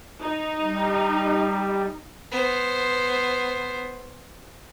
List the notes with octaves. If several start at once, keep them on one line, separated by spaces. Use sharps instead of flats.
D#4
G3
B3 C5